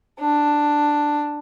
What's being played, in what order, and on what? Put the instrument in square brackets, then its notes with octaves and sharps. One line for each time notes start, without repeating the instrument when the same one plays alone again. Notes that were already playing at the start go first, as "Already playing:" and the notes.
[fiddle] D4